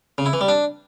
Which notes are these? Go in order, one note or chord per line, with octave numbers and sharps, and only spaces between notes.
C#3
E4
E3
G3
D4